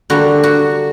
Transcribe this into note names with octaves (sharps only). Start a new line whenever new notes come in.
D3 G3 A#3 F#4
F#4